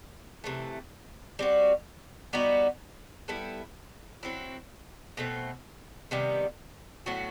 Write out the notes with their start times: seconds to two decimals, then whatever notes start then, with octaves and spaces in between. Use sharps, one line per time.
0.44 C3 E3 A3
1.39 G3 C4 F#4
2.33 G3 B3 D#4 F#4
3.28 G3 B3 E4 A4
4.23 F#3 C4 E4
5.17 B2 A3 C4
6.11 C3 D#3 G3 B3
7.06 A2 F#3 B3 F#4